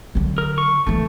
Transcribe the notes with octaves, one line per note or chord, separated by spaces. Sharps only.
D3 F#3
A#4
C#6
E3 A3 D#4